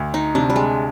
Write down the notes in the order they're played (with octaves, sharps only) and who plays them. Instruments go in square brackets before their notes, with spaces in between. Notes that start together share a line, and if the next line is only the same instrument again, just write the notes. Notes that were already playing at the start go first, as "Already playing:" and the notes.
Already playing: [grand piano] D2
[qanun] D#4
[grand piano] C3 [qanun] D4
[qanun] G3
G#3